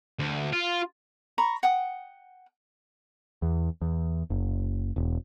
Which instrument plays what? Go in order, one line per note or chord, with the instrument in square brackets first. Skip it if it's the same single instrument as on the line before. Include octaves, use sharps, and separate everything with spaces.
[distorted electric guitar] D2
F4
[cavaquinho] A#5 B5 C#6
F#5 G5 D#6
[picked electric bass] E2
E2
F#1
E1